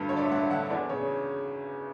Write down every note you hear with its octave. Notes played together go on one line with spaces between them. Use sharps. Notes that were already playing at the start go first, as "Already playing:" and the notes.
Already playing: D2 G2
D3 C#5
D5
E5
G2 F#5
D3 F#5
E2 D5
C#3 C#5